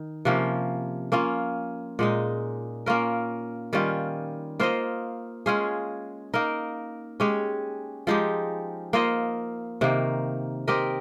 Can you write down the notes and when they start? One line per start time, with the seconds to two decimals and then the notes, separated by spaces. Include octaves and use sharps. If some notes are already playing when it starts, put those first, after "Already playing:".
Already playing: D#3
0.25 C3 F3 A#3 C#4
1.12 A#3 C#4 F4
1.99 A#2 G#3 D#4
2.86 A#3 C#4 F4 A#4
3.73 D#3 G3 C#4 F4
4.60 A#3 F4 C5 D#5
5.46 G#3 C#4 F4 G#4
6.34 A#3 D#4 A#4
7.20 G#3 C#4 G4 C#5
8.07 F3 G#3 D#4 G4
8.93 A#3 F4 C5 D#5
9.81 C3 D#3 A#3
10.68 C4 G4 A#4 D#5